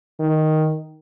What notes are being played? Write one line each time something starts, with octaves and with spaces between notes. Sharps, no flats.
D#3